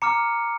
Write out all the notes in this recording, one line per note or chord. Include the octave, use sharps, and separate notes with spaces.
A#5 D6 F6 C#7